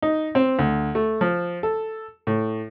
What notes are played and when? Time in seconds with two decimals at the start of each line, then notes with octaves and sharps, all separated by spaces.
0.02 D#4
0.35 C4
0.59 D2
0.95 A3
1.21 F3
1.63 A4
2.27 A2